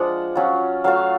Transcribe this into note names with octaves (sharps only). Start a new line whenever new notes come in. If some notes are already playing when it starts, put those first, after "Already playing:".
Already playing: F3 G#3 D4 F4 F#5
F#3 C#4 F4
F#3 A3 F4 F5